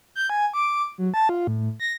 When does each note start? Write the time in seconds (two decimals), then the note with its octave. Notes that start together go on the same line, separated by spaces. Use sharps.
0.15 G6
0.30 G#5
0.53 D6
0.98 F#3
1.14 A5
1.29 F4
1.47 A2
1.80 A#6